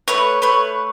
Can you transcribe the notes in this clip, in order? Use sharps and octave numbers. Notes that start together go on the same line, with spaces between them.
A3 B4 C#5
A3 B4 C#5